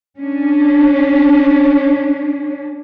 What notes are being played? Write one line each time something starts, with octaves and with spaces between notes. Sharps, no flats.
C#4 D4